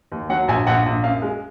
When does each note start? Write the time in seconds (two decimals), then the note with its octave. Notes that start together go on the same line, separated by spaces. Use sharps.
0.12 D#2
0.30 F#3 F#5
0.48 A#1 G#5
0.67 A#1 F#5
0.86 A#1
1.03 F#2 F5
1.22 G#3